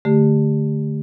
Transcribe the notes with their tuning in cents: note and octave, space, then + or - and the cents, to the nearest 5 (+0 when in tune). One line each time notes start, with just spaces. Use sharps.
D3 +0 A3 +0 G4 +10